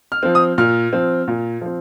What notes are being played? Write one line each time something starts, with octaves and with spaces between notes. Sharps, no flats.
F6
F3 C4
D#6
A#2 F6
F3 C4
A#2
F3 C4